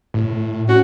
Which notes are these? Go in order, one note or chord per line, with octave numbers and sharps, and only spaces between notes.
A2
C#4 F#4